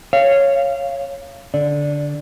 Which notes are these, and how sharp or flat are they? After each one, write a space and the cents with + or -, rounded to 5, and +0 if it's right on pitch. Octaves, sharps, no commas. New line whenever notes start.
C#5 +0 F5 -20
D3 -10 D5 +0